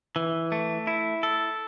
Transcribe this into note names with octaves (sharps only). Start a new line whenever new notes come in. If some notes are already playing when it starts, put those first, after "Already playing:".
E3
A3
E4
A4